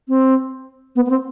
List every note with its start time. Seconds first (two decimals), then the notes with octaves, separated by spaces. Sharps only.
0.08 C4
0.96 B3
1.06 B3
1.10 C4